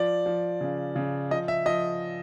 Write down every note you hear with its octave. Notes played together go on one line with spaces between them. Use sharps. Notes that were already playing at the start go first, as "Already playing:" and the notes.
Already playing: F3 D5
F3
C#3
C#3
F3 D#5
E5
F3 D#5